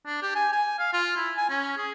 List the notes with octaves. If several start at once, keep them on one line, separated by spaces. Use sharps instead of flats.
D4
G4
G#5
G#5
F5
F4
E4
G#5
C#4
G#4